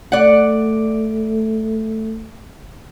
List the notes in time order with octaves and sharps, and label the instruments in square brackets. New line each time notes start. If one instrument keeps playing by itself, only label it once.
[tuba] A3 [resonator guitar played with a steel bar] D5 F#5